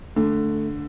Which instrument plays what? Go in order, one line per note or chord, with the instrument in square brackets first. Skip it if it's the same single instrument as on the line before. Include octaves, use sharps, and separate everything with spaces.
[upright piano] D3 [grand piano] A3